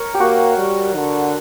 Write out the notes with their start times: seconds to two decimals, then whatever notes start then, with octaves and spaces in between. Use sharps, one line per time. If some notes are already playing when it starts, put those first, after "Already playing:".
Already playing: A#4 C#5
0.14 G4
0.20 A#3 F#4
0.58 G3
0.96 D3